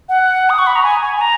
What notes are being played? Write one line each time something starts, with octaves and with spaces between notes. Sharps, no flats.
F#5
D#6
C#6
B5
A#5
G#5
G#5
G#5
A#5